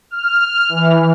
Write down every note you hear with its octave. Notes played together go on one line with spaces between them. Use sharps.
F6
E3